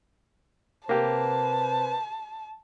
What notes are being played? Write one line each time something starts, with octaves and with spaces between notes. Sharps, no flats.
C3 A#3 G4 B4 C5 A5